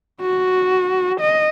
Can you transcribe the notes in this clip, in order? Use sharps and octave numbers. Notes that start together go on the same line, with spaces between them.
F#4
D#5